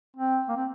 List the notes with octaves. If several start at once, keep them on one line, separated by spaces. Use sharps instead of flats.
C4
A#3
C4